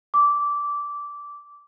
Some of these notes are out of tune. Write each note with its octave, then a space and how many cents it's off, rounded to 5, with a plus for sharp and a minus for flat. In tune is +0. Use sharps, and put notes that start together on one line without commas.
D6 -15